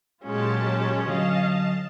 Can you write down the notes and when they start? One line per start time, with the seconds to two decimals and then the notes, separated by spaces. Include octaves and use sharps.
0.23 A#2 F#3 G#3 C#4 F4 G4 A5
1.06 D3 F#3 D#5 F5 A5